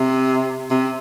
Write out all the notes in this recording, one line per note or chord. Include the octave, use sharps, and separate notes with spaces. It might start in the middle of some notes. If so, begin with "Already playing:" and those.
Already playing: C3
C3